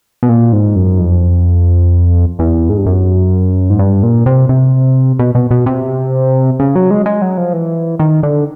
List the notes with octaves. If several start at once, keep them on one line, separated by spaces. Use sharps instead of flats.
B2
A#2
G#2
F#2
F2
E2
G#2
G2
F#2
G#2
G2
A#2
C3
C3
B2
B2
B2
C3
C#3
F#3
G#3
G#3
F#3
F3
E3
D#3
D3